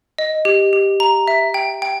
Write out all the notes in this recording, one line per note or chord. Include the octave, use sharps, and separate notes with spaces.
D#5
G4
G4
A#5
E5
G5
G5